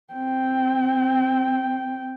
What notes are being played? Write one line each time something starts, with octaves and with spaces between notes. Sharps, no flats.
C4 G5